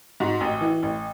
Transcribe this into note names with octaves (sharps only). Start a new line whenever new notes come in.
G#2 F#4
A1
E3
A1